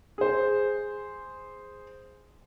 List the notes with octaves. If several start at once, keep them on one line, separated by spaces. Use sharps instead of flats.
G#4 C5